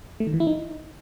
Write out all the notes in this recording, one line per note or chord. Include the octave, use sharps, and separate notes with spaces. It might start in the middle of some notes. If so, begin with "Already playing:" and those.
A3
D#3
E3
E4
D#4